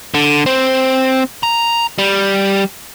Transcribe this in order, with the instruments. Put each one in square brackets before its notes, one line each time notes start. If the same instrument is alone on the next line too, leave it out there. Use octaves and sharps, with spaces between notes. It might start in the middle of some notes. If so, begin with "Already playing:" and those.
[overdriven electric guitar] D3
C4
A#5
G3